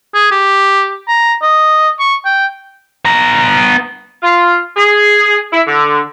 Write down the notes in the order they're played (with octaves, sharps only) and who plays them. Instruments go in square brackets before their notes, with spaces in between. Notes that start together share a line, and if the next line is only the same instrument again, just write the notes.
[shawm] G#4
G4
A#5
D#5
C#6
G5
[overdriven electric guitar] B3 A#5
[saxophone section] F4
G#4
E4
D3